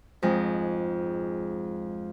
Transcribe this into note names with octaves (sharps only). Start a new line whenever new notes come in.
F2 G#2 G#3